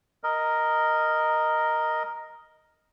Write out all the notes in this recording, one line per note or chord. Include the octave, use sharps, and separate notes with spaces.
A#4 D#5